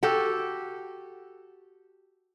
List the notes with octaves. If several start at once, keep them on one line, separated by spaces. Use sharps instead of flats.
F#4 G4 A4